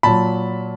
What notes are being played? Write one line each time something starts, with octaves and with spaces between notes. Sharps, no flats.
A#2 F#3 A5 B5